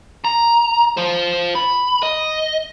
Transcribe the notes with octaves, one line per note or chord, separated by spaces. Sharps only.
A#5
F4 C5
B5
D#5